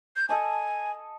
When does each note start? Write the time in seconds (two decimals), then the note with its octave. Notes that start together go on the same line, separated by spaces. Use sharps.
0.16 G6
0.29 A4 D#5 G#5 A5